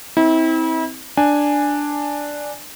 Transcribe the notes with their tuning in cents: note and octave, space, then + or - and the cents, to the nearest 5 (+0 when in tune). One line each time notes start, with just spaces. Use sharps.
C4 +0 E4 -35
D4 +0 G#5 +0